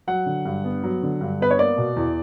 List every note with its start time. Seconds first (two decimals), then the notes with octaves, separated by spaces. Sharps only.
0.07 F#3 F#5
0.26 D3
0.45 G2
0.64 B3
0.83 F#3
1.03 D3
1.21 G2
1.41 B3 B4
1.51 C#5
1.59 A#3 D5
1.78 B2
1.96 E2